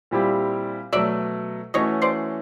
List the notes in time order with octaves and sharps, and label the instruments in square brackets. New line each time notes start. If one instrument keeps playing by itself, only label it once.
[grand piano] A#2 G3 C4 E4 G4
[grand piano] B2 F#3 A3 [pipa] D5 E5
[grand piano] E3 A3 C#4 F#4 [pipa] C#5 D#5
[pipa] C5 D5